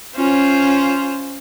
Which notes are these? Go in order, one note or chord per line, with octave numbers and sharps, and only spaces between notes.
C#4 F4 C5